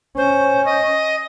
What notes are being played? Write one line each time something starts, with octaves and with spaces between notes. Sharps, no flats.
C#4 C5
D#5